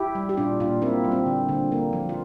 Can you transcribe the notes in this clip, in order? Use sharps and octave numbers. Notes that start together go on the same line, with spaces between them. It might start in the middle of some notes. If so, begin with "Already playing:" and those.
Already playing: E4 G4
G3
G4
A#2 D4 F4
A#2 D4 F4
A#3 C4 E4
G3
C4
D3
D3
A#3
F3
F4